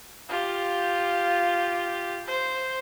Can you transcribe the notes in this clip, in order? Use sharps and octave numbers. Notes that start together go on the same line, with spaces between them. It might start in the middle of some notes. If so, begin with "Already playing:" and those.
F4 G4
C5